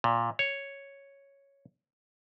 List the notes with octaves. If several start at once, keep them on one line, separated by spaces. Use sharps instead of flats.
A#2
C#5